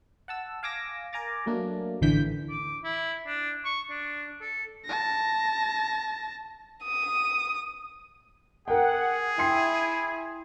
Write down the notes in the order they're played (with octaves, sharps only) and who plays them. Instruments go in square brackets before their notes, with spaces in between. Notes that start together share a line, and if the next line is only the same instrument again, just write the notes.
[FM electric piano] F#5 A5 E6
F5 G#5 D6 E6 A#6
A#4 G#5 A#5 D6 A6
F#3 A3 A#3 D4
A1 D2 D3 E3 G6 B6
[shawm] D6
E4
D4
C#6
D4
A4
[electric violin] A5 A#6
[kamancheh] D#6
[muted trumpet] G#4 [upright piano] A#4 G5 [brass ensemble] F#5
[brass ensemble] E4 [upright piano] G5 C6 C7